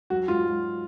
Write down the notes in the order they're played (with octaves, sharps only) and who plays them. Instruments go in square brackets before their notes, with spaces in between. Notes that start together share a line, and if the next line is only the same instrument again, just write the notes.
[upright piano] F#3 F#4
G#2 F4
F#3